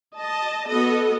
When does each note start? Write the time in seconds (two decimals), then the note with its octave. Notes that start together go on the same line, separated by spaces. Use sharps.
0.16 D#5 A5
0.67 B3 F#4 A4 D#5